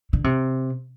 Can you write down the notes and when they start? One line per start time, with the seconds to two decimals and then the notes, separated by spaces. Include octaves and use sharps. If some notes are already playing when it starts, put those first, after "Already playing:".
0.13 D3
0.24 C3